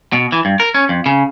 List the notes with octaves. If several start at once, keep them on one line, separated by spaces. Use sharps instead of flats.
B2
E3
G2
A#4
C#4
F2
C#3